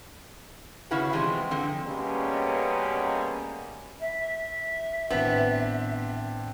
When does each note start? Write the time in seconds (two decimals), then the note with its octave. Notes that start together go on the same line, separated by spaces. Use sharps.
0.91 C#3 C#4 E4 F#4 G#4 B4
1.13 C3 E3 F3 G#3 C4
1.51 D3 F3 C4
1.85 B2 G3 G#3 A#3 C#4
4.01 E5
5.10 G#1 A2 B3 C4 D4